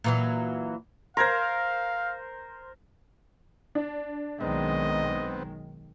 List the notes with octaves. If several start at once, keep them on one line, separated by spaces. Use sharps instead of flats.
A#2 E3 F#3
A#4 C5 F5 C6 G#6 A#6
D4
B1 D#3 G#3 B3 C4 D#5